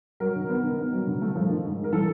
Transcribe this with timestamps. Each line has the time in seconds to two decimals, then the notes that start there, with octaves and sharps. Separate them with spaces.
0.20 F#3 A#4
0.35 D#3
0.49 B3
0.63 D#3
0.79 B3
0.93 F#3
1.07 D3
1.21 A3
1.35 F3
1.50 D#3
1.64 G#2
1.79 G#3
1.84 A#4
1.93 E3 A4